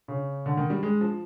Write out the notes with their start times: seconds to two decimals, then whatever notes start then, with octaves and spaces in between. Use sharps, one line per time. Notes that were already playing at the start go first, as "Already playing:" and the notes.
0.08 C#3
0.46 D3
0.57 D#3
0.70 G3
0.83 G#3
1.01 F3